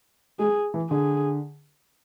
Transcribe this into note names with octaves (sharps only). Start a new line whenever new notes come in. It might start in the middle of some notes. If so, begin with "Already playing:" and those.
G#3 G#4
E3
D3 G#4